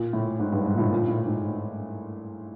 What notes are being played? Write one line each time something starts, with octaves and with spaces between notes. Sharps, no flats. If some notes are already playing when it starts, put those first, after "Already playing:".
Already playing: A#2
A2
G#2
G2
G#2
A#2
A2
A#2
A2
G#2